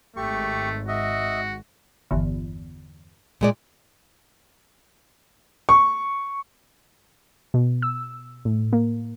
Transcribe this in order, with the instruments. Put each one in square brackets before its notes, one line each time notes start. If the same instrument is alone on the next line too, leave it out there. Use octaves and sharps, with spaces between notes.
[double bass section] G#1 [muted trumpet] A3 [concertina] G4 C#6
[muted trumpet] F#4 [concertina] D#5 E5
[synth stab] G1 E2
[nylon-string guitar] A#2 G#3 D5
[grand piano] C#6
[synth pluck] B2
E6
A2
A#3